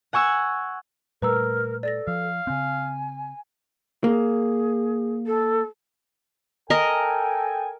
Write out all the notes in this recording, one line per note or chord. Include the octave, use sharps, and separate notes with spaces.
F#5 G#5 C#6 E6 G#6
A#2 G3 A3 A#4 B4 A#5 E6
A4 D5 A6 A#6
F3 F5
C#3 C4 G#5
A#3 G#4
A4
A4 A#4 D#5 G5 G#5